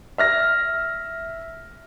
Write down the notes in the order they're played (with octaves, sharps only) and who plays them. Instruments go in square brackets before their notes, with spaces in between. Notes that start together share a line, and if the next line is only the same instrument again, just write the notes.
[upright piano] E5 F6 A#6